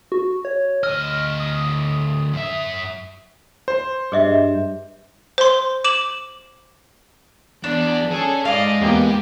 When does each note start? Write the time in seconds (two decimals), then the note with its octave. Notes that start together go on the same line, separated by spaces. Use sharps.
0.12 F#4
0.45 C#5
0.83 D2 D#5 F6
1.40 D#6
2.33 F#2 E5
3.68 C5
4.12 G2 G#4 D#5 E5
5.38 C5 C6
5.84 D6 E7 F#7
7.64 E2 D4 D5
8.11 C#4 G#4 A4
8.45 G#2 D5 D#5 F5 D6
8.81 E2 A#3 B3 G4